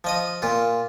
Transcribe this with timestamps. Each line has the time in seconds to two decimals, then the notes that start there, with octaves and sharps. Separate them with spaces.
0.04 F3 D#5 D#6
0.42 A#2 F4